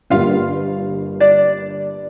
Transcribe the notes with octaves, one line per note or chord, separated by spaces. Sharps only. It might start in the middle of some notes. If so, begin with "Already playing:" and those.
G1 G2 G3 A#3 F4 F5
D4 D5